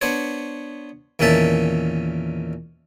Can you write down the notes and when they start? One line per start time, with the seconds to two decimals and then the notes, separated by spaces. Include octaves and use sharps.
0.01 B3 D4 C5 C#5
1.19 E2 A#2 D#3 C#4 E5 A5